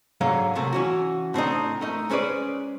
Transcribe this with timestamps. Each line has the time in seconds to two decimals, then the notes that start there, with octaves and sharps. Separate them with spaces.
0.21 G#2 D3 F#3 C#5 F5
0.55 C3 A3 A#3
0.73 E3 C#4 F#4
1.34 A2 C4 D4 D#4
1.81 A3 D#4 A#4
2.09 G#3 C#4 B4 C5 D5